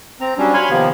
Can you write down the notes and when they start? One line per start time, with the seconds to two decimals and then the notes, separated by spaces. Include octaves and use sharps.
0.21 C4 A#5
0.38 F#3 G3 C#4 D4
0.54 C#5 F5 G#5 B5 C6
0.70 C3 D#3 F3 A#3 B3